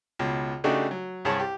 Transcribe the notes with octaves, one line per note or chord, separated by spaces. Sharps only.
C#2 B2
C#3 A3 D4 D#4 F#4 G4
F#3
C2 G2 G#4 C#5 A5 C#6
G4